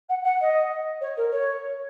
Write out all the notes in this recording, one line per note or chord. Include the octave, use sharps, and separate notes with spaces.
F#5
F#5
D#5
C#5
A#4
C#5